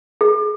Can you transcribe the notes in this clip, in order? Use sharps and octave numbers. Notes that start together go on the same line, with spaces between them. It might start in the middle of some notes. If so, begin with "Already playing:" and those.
G#4